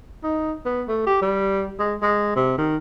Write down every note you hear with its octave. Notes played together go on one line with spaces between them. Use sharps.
D#4
B3
A3
G4
G3
G#3
G#3
C3
D#3